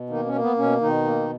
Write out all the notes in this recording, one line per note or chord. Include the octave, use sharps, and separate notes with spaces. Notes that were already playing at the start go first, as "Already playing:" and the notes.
Already playing: B2
D#3 A#3 D#4
C#4
A#3
B3
B2 C#4
B2 D#3 D#4
A#3